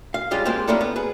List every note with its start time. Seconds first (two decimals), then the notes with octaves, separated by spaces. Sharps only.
0.14 F5
0.31 G3 G#3 C#4 F4 G4
0.45 G#3 A#3 C4 F4 G4 C5
0.68 F2 A#3 C#4 E4 A4 D5
0.81 B3
0.96 G#4 B4